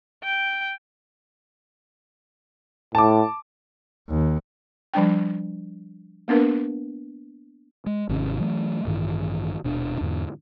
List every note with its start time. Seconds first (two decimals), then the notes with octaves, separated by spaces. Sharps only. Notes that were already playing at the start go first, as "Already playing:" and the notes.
0.24 G5
2.95 A2 A5 D6
4.10 D#2
4.94 F3 G3 D4 G5
6.28 A#3 B3 D4 A#4 B4
7.86 G#3
8.09 G#1 C3 D#3 C#4
8.40 E3 F#3 A3
8.85 A1 G2 D#3 E3
9.64 D#1 B2 D4
10.01 E2 G#2 D3